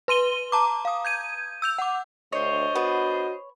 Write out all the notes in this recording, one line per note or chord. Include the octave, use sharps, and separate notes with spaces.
B4 C6 D#7 G7
A5 A#5 D6
F5 D#6
G6 G#6 D#7
E6 G6 F7
F#5 D6
D2 D4 C5 C#5 D#5
B3 F#4